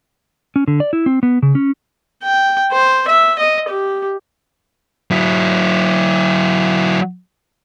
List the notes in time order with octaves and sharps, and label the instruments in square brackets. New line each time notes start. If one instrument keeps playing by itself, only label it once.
[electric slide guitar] C#4
D3
D5
E4
C4
B3
C#3
C#4
[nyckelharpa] G5
C5
E5
D#5
G4
[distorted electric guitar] F#3 E4